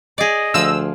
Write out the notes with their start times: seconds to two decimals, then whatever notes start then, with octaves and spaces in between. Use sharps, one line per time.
0.18 G#4 D5 D#5
0.54 D2 F3 E6